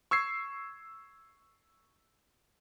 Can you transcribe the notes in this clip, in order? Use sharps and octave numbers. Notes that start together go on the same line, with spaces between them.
C#6 E6 G#6 C7